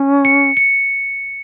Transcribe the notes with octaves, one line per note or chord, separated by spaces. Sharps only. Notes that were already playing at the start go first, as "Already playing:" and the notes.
Already playing: C#4
C#7
C#7